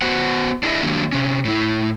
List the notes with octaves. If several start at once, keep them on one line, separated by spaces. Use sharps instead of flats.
B3 F#4 C5 F#5
D4 E4 G#4 C5 D#5 E5
D#3 F#3 G3 A#3 D4
C3 C#4
A2 E4